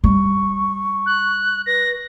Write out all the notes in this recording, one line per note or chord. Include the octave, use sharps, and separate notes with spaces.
G3 C#6
F#6
B4 A#6